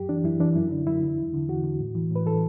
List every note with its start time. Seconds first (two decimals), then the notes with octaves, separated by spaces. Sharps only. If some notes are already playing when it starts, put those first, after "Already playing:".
Already playing: F#2 G4
0.09 E3 D4
0.24 F#2 E4
0.40 E3 D4
0.56 F#2 E4
0.71 D3 D4
0.87 F#2 E4
1.02 D3
1.18 E2
1.34 D3
1.48 E2 F#4
1.64 D3
1.80 A2
1.95 E3
2.11 A2 B4
2.26 E3 A4